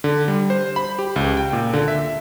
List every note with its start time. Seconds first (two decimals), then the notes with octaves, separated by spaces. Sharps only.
0.04 D3
0.28 G3
0.50 C5
0.76 B5
0.99 G4
1.16 C#2
1.37 G5
1.53 A#2
1.74 D3
1.88 E5